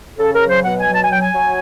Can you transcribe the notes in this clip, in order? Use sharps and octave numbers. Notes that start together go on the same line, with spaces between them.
C#3 A4
A#4
F#3
C5
B2 F#5
G#5
F#3
A5
G#5
F#3 G5
G#5
F#3